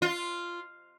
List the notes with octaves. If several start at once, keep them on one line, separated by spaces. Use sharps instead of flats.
F4